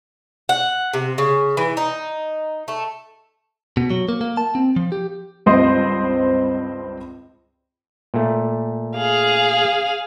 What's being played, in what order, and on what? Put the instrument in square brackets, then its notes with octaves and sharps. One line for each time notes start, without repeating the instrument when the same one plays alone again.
[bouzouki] F#5
C3
C#3
E3
D#4
A3
[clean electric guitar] B2
F#3
A#3
A#3
A5
C4
F3
G4
[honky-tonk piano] C#2 G2 C4 C5 D#5 C6
[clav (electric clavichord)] A#2 A3
[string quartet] G#4 F5